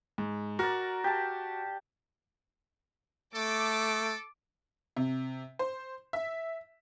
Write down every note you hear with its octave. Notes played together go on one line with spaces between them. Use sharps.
G#2
F#4 A#4 D5
G4 A5
A3 A4 D6
C3
C5
E5